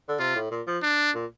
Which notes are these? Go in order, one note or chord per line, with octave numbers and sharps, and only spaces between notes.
D3
C3 F4
A2
A#2
F3
D4
A#2